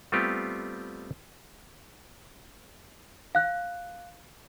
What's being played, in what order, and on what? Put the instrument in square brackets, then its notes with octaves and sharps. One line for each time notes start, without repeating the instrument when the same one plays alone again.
[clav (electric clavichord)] G3 A3 B3 C4 F4 G4
[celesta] F5 F#6